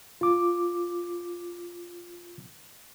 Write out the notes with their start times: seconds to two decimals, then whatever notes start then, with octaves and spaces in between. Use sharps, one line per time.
0.21 F4 D6